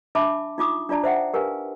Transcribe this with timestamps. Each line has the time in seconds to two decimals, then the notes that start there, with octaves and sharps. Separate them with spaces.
0.15 D4 E5 A5 B5 D6
0.58 D#4 F4 D6 D#6
0.89 D4 F4 D5 A5 A#5
1.04 C5 E5 F#5 G5
1.33 G4 A#4 B4 F5 G#5